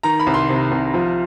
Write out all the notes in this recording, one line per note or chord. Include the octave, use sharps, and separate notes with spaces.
D#3 A#5
B5
C2
C6
C3
C2
F3